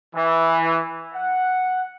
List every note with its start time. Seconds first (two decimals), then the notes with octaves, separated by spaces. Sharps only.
0.15 E3
1.14 F#5